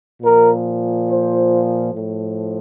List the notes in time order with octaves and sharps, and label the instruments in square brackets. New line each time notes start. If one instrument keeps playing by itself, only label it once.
[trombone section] A#2 F3 A#4
C5
A2 F3